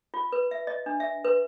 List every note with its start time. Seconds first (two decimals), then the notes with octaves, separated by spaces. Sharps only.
0.14 F4
0.32 B4
0.51 E5
0.67 D#5
0.86 D4
1.00 E5
1.25 B4